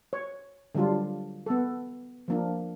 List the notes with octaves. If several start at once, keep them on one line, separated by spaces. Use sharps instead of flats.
C#5
D3 F#3 G3 D4 F4
B3 A4
F3 A#3 D4